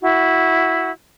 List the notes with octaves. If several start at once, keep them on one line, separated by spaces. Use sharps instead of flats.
E4 F#4